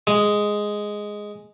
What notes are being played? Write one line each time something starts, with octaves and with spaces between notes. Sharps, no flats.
G#3